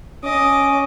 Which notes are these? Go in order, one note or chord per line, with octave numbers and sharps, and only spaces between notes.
C#4 D#5 D6